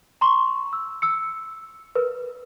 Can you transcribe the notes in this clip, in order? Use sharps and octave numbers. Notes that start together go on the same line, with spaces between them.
A#5 C6 C#6
E6
E6 C#7
A#4 B4